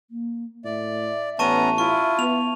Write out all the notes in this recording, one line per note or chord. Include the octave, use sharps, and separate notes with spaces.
A#3
A2 D5 E5
A1 B3 C#4 A5 A#5 C#6 D#7
E4 F4 C#6
B3 F7